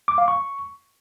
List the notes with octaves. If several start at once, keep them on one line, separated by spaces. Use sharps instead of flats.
D6
F5
C#6